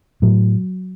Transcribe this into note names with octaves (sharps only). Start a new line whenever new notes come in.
A2 F#3